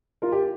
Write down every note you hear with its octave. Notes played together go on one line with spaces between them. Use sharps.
F4 A#4
G4